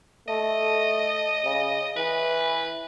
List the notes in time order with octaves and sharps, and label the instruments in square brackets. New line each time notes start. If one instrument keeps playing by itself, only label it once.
[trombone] A3 [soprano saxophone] D#5
[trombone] C#3
[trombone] E3 [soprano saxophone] B4